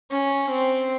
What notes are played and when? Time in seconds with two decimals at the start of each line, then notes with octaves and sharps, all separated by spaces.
0.12 C#4
0.50 C4